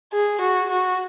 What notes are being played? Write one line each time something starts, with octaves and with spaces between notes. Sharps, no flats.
G#4
F#4
F#4